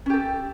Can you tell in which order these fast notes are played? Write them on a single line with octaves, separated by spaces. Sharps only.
C#4 G4 A4